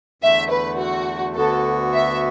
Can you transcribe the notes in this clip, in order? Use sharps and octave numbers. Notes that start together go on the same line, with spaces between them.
E2 D3 A3 E5
B4
F#4
D2 D3 B3 F#4 A4
E5